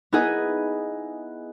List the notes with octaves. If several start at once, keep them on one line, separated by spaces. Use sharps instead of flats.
B3 D#4 E4 G#4 B4 D#5